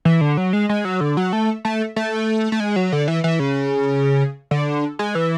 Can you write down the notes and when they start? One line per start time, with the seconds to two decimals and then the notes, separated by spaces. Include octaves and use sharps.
0.05 E3
0.21 D3
0.37 F#3
0.53 G#3
0.69 G#3
0.85 F#3
1.01 D3
1.17 F#3
1.33 A3
1.65 A3
1.96 A3
2.52 A3
2.60 G#3
2.76 F#3
2.92 D3
3.08 E3
3.24 E3
3.40 C#3
4.51 D3
4.99 G#3
5.15 E3